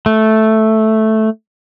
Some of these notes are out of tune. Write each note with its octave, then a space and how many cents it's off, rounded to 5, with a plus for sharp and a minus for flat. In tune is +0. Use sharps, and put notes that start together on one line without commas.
A3 -5